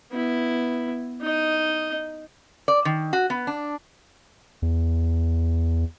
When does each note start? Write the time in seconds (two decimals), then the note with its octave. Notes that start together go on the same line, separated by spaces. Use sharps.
0.12 B3 E4
1.22 D#4 D#5
2.68 D5
2.85 D#3
3.13 F#4
3.30 B3
3.47 D4
4.62 E2